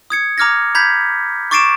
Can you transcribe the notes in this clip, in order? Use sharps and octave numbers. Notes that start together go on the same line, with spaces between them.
D#6 G#6 C#7
A#5 D6 F6 G#6 A#6
A#5 B5 G6 G#6 B6
C#6 D6 A6 C7 D7 E7